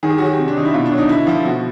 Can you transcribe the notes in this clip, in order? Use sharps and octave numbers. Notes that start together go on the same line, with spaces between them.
D#3 G#4
G4
F#3 F#4
G4
C3
D4
D#3 D#4
E4
B2 F4
D4
F#3
D#4
D3 E4
F3
B2 F#4